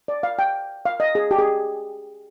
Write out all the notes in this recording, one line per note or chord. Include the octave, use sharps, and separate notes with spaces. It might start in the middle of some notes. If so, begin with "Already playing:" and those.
D5
F5
G5
F5
D#5
G#4
G4
G#4